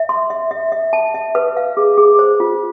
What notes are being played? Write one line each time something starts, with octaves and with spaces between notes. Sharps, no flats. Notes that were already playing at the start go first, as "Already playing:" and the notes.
Already playing: E5
C6
E5
E5
E5
A5
E5
B4
F5
G#4
G#4
C5
F4